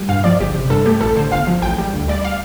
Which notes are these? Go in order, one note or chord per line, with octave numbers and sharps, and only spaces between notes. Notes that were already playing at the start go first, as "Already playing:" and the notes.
Already playing: G3
G2 F5
F3 D5
G1 G4
C3
G2 A4
A3 G4
A1 A4
D3 C5
G1 F5
F3
A1 G5
G3
D2
G3 D5
F5